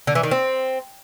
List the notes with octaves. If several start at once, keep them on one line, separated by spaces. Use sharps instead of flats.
D3
E3
D#3
C4